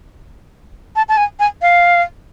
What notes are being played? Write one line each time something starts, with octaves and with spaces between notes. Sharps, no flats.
A5
A5
G#5
G#5
F5